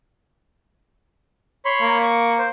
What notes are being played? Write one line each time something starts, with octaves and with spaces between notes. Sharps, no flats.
C#5 B5 C6
A#3
C#6
C5